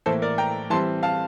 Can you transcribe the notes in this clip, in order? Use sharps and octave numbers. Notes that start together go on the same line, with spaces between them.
A2 E3 A#3 A4 C5
A#4 D5
G5 A#5
E3 G3 C4 A5 C6
F5 A5